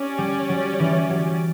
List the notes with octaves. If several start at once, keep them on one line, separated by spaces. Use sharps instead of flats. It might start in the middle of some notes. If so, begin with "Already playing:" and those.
Already playing: C#4 G4 D5
G3
F#3
E3
F#3